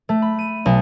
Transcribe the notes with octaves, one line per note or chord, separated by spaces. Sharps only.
A3
B5
D#7
B1